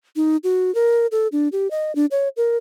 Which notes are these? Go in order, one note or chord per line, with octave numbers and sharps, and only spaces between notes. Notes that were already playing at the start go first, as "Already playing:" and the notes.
D#4
F#4
A#4
A4
D4
G4
D#5
D4
C#5
A#4